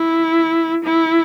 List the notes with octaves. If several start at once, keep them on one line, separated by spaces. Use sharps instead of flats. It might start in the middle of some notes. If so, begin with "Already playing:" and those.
Already playing: E4
E4